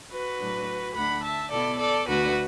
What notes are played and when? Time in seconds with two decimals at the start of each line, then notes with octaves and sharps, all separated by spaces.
0.10 F#4 B4
0.39 A2 F#3 D4
0.95 D2 D3 A3 D4 F#5 B5
1.23 E5 A5
1.51 B2 B3 E4 A4 D5
1.79 A4 D5
2.07 D2 D3 A3 D4 F#4 B4